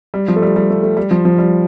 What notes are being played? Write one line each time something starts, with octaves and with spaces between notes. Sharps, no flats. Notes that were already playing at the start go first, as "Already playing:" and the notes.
G3
F3
A3
G3
G3
A3
A3
G3
F3
F3
G3